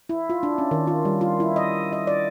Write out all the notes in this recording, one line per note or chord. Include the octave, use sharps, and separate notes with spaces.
E4
F4
D4
C#4
D#3
F4
G3
F4
E4
D#5
D#5
D5